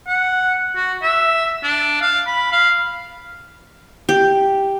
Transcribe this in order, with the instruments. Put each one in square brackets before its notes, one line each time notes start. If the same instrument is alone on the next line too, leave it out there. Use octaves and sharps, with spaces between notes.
[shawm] F#5
F#4
E5
D4
F5
B5
F5
[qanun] G4